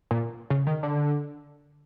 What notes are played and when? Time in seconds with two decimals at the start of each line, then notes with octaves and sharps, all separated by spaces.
0.11 A#2
0.50 C#3
0.67 D#3
0.83 D3